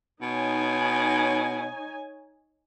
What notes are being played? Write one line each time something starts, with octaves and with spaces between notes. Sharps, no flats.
B2 D#4 C#5 G#5